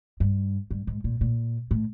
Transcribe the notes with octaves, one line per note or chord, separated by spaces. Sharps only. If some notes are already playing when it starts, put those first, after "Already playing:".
G2
G2
G#2
A#2
A#2
A2